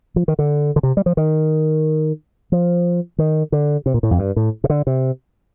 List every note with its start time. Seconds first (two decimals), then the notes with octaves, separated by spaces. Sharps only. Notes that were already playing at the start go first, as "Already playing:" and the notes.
0.16 F3
0.28 D#3
0.39 D3
0.76 D3
0.83 C3
0.97 G3
1.06 F3
1.17 D#3
2.52 F3
3.18 D#3
3.52 D3
3.86 C3
3.94 A#2
4.03 A2
4.11 F2
4.19 G2
4.36 A2
4.64 C3
4.70 D3
4.87 C3